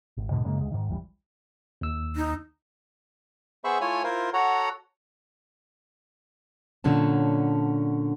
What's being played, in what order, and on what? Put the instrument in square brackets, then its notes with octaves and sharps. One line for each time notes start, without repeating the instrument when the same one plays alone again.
[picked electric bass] G#1
D#2 G#2 B2 D3
F#2 C#3 G#3 A#3
D2 G#3
G#2 D#3
D#1 A#1 E3 G3
[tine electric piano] D#2 E6
[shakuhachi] D#4
[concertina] B3 G#4 C5 E5 B5 C#6
A3 E4 F4 C#5 G#5
E4 F4 A#4 C5
F#4 A4 C#5 F#5 A#5
[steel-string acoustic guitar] A#2 D3 F#3 C#4 A5